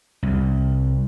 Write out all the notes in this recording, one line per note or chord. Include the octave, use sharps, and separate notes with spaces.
C2